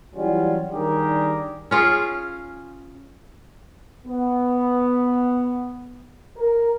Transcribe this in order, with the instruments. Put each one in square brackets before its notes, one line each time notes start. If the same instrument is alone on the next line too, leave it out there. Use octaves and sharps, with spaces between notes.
[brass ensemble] E3 F#3 G3 C#4 F4
D#3 G3 D4 G4 G#4 A#4
[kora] C#4 F4 G#4
[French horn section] B3
A#4